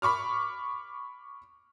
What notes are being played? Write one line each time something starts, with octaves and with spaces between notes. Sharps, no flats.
B5 C#6 D6 F6